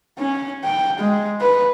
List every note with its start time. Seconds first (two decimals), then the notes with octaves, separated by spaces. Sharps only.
0.18 C#4
0.64 G5
0.99 G#3
1.41 B4